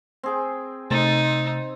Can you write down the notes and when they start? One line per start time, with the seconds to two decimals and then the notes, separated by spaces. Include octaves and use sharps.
0.23 C4 G#4 G5
0.91 C3 A3 C4 D#4 A6